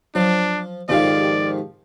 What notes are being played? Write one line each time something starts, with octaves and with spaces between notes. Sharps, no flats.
F3 F#3 D4
F2 G#2 D#3 F3 G4 D5 F5